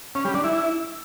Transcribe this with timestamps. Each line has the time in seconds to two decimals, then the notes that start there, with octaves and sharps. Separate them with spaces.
0.15 C#4
0.25 G3
0.34 D4
0.44 E4